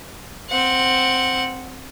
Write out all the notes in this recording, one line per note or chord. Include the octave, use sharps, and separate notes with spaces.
C4 F#5